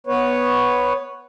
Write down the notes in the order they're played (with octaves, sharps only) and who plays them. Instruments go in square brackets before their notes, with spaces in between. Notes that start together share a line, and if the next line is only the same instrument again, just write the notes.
[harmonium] B3 B4 C#5